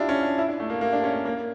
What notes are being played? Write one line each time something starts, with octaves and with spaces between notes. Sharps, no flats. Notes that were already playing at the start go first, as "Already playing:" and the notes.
Already playing: D4 E4 F4 G4
C#4
D4
E4
D4
A3
A#3
A#3
D4
C#4
A#3
A#3